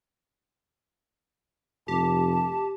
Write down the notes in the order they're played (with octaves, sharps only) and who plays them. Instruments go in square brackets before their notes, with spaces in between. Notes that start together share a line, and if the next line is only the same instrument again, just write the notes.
[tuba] F1 [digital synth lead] G4 [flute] A5